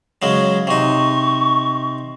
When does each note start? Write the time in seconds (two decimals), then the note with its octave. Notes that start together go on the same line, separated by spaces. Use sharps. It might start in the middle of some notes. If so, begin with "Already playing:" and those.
0.22 C#3 F#3 G#3
0.67 C3 D#4 C#6